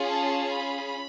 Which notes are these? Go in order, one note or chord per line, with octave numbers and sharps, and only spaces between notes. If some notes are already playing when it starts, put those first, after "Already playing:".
Already playing: C#4 F4 G#4
A5
B5